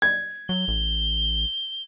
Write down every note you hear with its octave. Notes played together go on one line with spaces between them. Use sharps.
G#6
F#3 G7
A1